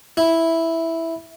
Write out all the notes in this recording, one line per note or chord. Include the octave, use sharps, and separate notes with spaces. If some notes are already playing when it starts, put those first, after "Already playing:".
E4